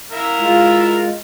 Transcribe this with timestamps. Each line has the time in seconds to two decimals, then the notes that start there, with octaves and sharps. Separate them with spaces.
0.12 E4 A#4 F5
0.41 G#3 F4